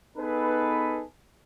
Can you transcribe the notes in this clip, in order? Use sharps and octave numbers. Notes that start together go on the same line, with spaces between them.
B3 D#4 G#4 A4 B4